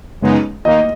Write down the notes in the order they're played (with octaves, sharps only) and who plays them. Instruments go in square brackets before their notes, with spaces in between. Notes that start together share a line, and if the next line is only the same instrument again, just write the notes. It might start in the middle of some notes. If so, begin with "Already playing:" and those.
[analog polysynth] F#2 C#3 G#3 B3 D#4
[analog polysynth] D#2 D#3 A#3 D#4 [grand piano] D#5